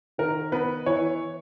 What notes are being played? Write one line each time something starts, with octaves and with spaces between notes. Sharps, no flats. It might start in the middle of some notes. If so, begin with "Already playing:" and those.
D#3 A#4
B3 B4
E3 C#5